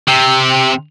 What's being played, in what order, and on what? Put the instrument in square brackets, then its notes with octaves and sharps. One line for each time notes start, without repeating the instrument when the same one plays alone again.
[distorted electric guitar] C3